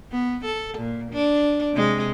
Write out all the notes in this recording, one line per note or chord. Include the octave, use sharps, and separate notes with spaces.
B3
A4
A#2
D4
C3 G#3